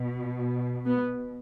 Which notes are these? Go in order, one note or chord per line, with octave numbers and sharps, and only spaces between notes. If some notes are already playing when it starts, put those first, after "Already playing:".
Already playing: B2
B3